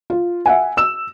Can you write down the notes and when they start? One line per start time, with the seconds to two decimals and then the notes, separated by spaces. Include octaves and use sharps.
0.10 F4
0.46 E5 F#5 G#5
0.77 E6 E7